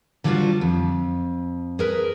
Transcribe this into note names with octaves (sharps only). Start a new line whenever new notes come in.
D3 F#3 G3 D#4 F4 C5
F2
G#4 A#4 B4